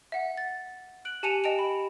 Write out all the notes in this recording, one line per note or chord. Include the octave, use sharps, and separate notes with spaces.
E5 F#5
A6
F#6 D7 F#7
G4 G#5 A5 C#7 D#7 F7
D#5 G5 A5 D7 F7
B5